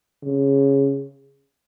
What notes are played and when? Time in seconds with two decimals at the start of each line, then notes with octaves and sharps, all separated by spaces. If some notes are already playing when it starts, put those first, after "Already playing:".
0.23 C#3